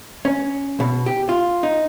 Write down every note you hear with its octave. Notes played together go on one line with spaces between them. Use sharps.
C#4
B2
G4
F4
D#4